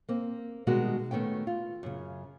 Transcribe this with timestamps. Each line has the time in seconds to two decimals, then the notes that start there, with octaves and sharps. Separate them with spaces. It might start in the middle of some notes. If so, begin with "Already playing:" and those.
0.09 A#3 C4
0.67 B2 D#3 G3 G#3 F#4 A#4
1.11 D#3 A3 B3 C#4 G5
1.47 F4
1.83 F#2 C#3